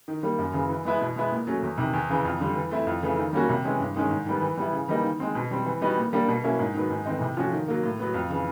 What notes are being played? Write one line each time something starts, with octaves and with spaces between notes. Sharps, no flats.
D#3
G3 A#3
F#2
C#3 E3
E3
G#3 B3 E4
B2
G#3 B3 E4
A#2
F#3 A3 C#4
E2
C3 D#3
E2
C#3 E3
F2
D3 G3
E3
A3 C4 E4
F2
C#3 E3 A3
D#3
G3 A#3 C#4 F#4
C3
E3 G#3 C#4
G2
D#3 G#3 C#4
G#2
D#3 G3 B3
E3
G3 B3 E4
C#3
E3 G3 A#3 D#4
D#3
G#3 C4
B2
G3 C4
E3
G3 B3 D#4 F#4
A#2
G3 A#3 D4
B2
F#3 A#3 C#4 E4
G#2
D#3 F#3 B3
G#2
E3 A3 C4 D#4
C3
F3 A3 C#4 F#4
D#3
F#3 A#3
A2
F#3 B3
F2
C#3 E3